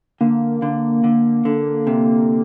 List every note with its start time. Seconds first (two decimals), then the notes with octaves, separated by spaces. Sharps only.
0.21 D3 A#3
0.62 D3
1.04 D3
1.45 D3
1.87 C3